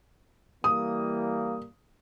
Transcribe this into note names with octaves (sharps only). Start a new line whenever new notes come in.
E3 G3 A#3 D#6